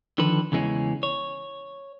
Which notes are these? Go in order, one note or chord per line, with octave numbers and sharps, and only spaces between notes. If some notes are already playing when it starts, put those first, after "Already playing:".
D3 D#3 F3 A4 B4
E2 C#3 E3 G#3 C4 C#4
C#5